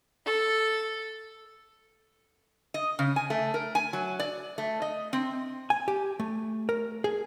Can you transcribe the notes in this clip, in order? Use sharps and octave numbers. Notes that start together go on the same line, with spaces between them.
A4
D#5
C#3
G#5
A3
A#4
G#5
F#3
D5
A3
D#5
C4
G#5
G4
A3
A#4
G#4